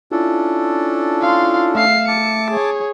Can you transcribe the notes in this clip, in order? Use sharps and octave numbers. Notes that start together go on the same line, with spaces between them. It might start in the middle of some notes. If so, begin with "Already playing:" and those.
C#4 D4 E4 F4 A4
F5 C6
A3 E5 F5 C7
A5 D6 C#7
G#4 C#5